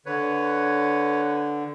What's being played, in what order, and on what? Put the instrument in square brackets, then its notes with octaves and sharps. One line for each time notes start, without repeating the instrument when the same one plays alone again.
[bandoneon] D3 [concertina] B4 C#5